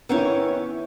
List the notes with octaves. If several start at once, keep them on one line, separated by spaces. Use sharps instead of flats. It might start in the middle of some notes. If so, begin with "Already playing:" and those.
D#3 E3 B3 C#4 E4 C#5